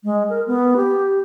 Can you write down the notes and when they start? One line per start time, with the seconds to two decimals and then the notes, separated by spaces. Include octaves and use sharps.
0.04 G#3
0.30 A#4
0.47 B3
0.76 G4